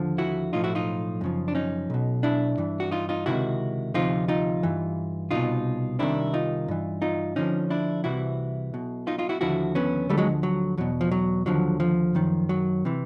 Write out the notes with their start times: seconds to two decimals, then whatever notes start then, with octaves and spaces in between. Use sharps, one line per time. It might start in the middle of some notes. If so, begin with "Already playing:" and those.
Already playing: D#2 D3 F3
0.18 E4 F#4
0.52 B1 A2 F3 D#4 F4
0.64 E4 F#4
0.75 D#4 F4
1.21 F#2 C#3 F3
1.48 D4
1.55 C#4 D#4
1.90 B1 B2
2.23 D4 E4
2.58 G2 E3
2.80 F#4
2.91 D#4 F4
3.09 D#4 F4
3.26 C#2 C3 D#3 E4 F#4
3.94 D2 C3 F3 D#4 F4
4.28 D#4 F4
4.63 G2 E3
5.31 C2 B2 D#4 F4
5.99 C2 C3 D#3 D4 E4
6.34 D#4 F4
6.68 G2 E3
7.02 D#4 F4
7.36 D2 D3 F3 C#4 D#4
7.70 D4 E4
8.04 C2 C3 E3 E4 F#4
8.73 B1 B2
9.07 D#4 F4
9.18 D#4 F4
9.29 E4 F#4
9.41 D#2 D3 F3 E4 F#4
9.75 B3 C#4
10.09 D2 D3 F3 G3 A3
10.17 F#3 G#3
10.43 F#3
10.78 E2 B2 F#3
11.01 F3
11.11 F#3
11.46 D#2 D3 F3 F#3
11.80 F3
12.15 F#2 D#3
12.49 F#3
12.85 C3 E3